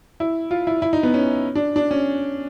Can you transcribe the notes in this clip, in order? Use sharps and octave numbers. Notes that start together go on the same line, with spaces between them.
E4
F4
E4
E4
D#4
B3
C#4
D4
D4
C#4